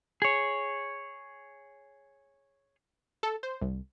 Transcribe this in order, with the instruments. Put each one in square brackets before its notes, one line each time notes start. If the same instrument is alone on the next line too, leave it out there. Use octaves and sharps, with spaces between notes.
[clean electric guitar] G#4 C#5
[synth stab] A4
C5
C2